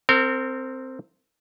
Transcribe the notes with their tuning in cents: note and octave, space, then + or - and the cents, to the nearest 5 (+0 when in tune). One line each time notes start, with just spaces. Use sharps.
C4 +0 A#4 -35